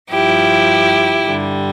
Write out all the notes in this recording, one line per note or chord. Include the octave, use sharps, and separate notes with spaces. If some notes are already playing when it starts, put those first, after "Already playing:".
G2 F3 E4 G4
G2 D3 G3